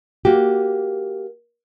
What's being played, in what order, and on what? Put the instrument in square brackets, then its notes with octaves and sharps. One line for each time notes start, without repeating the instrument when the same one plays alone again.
[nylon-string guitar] A#3 F#4 G4